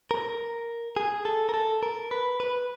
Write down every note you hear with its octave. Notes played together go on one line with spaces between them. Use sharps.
A#4
G#4
A4
A#4
A4
A#4
B4
B4